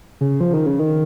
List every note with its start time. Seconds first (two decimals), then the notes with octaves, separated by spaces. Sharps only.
0.21 C#3
0.40 F3
0.53 D#3
0.66 C#3
0.79 D#3